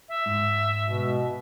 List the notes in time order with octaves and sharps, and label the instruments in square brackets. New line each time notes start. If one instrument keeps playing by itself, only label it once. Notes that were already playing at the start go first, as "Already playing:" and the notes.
[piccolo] E5
[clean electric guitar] G#2
[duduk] B2